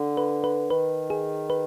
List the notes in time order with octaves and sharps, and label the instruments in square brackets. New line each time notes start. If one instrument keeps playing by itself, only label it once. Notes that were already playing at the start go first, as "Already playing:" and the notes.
Already playing: [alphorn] D3
[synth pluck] B4
B4
[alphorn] D#3 [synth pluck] B4
[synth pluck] G#4
B4